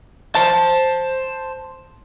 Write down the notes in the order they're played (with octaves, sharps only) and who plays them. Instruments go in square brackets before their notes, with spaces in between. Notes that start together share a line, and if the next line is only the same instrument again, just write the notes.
[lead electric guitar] C5 A5